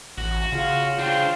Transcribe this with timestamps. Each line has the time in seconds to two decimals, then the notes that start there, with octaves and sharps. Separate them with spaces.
0.18 A1 F#4
0.52 C#3 F4
0.99 D4 F4 C5 G5